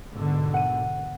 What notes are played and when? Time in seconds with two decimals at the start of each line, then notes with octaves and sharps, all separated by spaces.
0.12 G#2 B2 D3
0.54 F#5 D#7